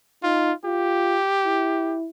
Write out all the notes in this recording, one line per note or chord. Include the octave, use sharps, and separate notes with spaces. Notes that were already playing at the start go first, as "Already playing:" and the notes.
D#4 F4
F4 G4
E4